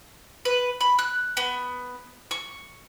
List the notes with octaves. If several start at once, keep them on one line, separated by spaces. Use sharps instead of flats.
B4
B5
F#6
B3
C#6